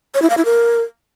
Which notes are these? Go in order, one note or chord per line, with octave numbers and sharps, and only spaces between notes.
C#5
E4
F5
E4
A#4